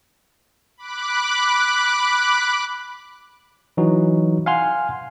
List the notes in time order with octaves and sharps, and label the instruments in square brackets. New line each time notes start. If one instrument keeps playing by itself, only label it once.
[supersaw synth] B5 D6 F#6
[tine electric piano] E3 F#3 D#4 F#4
F5 F#5 G#5 C6 F6